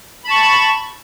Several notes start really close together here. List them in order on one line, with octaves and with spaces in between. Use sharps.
B5 A5 C#6